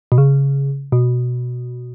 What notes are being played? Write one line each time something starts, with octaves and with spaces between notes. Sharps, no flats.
B2
C#3
B2